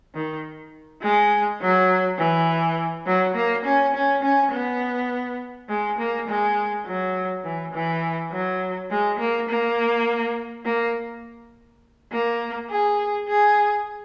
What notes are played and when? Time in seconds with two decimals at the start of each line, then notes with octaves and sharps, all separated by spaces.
0.15 D#3
1.02 G#3
1.61 F#3
2.19 E3
3.06 F#3
3.35 A#3
3.65 C#4
3.95 C#4
4.23 C#4
4.52 B3
5.69 G#3
5.99 A#3
6.28 G#3
6.86 F#3
7.45 E3
7.73 E3
8.32 F#3
8.91 G#3
9.19 A#3
9.49 A#3
10.65 A#3
12.12 A#3
12.70 G#4
13.28 G#4